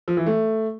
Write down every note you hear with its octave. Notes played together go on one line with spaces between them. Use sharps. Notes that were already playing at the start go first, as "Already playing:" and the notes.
F3
E3
A3